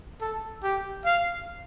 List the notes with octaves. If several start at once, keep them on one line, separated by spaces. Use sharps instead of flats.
A4
G4
F5